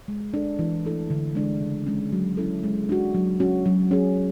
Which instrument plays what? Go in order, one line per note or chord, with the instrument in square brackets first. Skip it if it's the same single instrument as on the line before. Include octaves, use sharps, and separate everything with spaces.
[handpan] G#3
D4 A4
E3
A3 E4 A4
D3
G#3 D4
C#3
G#3 C#4
F#3
C#4 E4 A4
G#3
D4 F#4
F#3
C#4 F#4
F#3
C#4 G#4